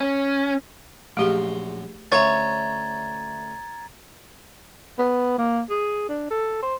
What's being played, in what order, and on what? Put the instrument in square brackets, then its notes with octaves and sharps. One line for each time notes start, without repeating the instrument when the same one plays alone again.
[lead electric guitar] C#4
[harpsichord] A#1 F#2 C6 [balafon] A3 G4 G#4
[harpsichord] D2 C#4 E5 [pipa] F4 C#5 [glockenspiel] A#5 G#6 A6
[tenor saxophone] B3
A#3
G#4
D4
A4
C5